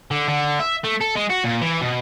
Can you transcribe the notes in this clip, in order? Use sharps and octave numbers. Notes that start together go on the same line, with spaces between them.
D3
D3
E5
A3
A4
G#3
F#4
A#2
E3
B2